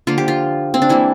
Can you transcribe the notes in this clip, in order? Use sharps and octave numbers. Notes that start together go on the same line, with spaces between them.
D3 F3 A#3 F4
G4
F4
C4
D4
E3 G3 A#3 E4